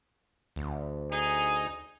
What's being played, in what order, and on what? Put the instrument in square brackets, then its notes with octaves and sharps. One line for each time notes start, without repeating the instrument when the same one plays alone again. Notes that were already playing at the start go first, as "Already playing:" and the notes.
[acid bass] D2
[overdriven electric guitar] D#4 [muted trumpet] G#4